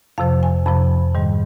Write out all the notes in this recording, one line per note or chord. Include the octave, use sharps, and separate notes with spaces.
F2 C3 F3 F5
G#5
F2 C3 F3 B5
G#2 D#3 G3